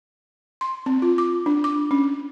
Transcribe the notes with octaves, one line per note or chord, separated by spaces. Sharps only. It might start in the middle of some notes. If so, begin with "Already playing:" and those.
C6
C4
F4
D6
D4
D6
C#4